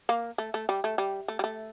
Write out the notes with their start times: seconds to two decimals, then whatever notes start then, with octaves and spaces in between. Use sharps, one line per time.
0.09 A#3
0.38 A3
0.54 A3
0.69 G3
0.84 A3
0.98 G3
1.28 A3
1.39 G3
1.44 A3